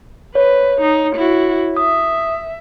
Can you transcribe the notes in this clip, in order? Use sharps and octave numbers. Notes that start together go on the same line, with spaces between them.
B4 C#5
D#4
E4 F#4
E5 D#6